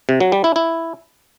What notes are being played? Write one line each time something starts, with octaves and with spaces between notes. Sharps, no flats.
C3
F#3
G3
E4
E4